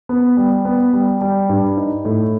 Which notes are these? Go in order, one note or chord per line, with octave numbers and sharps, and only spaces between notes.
B3
G3
B3
G3
G3
G2
D#4
A2